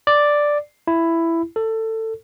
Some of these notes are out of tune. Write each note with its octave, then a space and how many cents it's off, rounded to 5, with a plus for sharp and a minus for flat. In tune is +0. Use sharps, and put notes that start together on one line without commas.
D5 +0
E4 +10
A4 +20